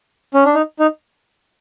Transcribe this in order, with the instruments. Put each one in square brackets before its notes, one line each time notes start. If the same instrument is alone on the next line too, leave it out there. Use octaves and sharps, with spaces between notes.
[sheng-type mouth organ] C#4
D4
D#4
D#4